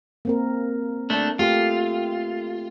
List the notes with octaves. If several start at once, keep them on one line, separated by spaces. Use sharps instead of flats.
A#3 C4 A#4
A3 D4
A3 F4 G4 A4